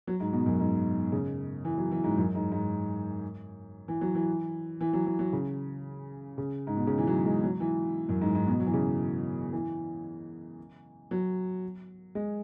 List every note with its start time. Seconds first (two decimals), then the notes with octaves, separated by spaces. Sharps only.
0.07 F#3
0.20 G#2
0.33 B2
0.46 F#2
0.60 G#2
1.12 C#3
1.65 E3
1.78 F#3
1.91 E3
2.04 G#2
2.18 F#2
2.35 G#2
2.52 G#2
3.88 E3
4.01 F#3
4.15 E3
4.81 E3
4.93 F#3
5.06 E3
5.19 F#3
5.33 C#3
6.38 C#3
6.67 G#2
6.77 B2
6.87 C#3
6.98 E3
7.07 F#3
7.26 G#3
7.43 F#3
7.60 E3
8.09 F#2
8.21 G#2
8.35 G#2
8.47 B2
8.60 F#3
8.67 E3
8.74 C#3
9.53 E3
11.11 F#3
12.15 G#3